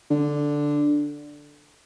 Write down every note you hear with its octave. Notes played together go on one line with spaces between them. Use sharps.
D3